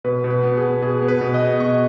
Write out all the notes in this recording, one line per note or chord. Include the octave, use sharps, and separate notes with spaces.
B2 B4
B2
B4
B3
G#4
B2
B2 G#4
B3
B4
B2
D#5
B3
B2 C#6